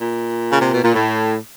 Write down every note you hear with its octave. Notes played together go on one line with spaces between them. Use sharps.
A#2
C#3
C3
B2
A#2
A2